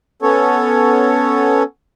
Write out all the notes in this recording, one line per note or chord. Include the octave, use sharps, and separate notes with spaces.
B3 C#4 A4 C#5